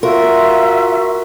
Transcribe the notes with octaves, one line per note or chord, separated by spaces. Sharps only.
F4 F#4 A#4 E5